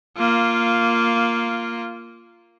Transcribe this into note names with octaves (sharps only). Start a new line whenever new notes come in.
A#3 F4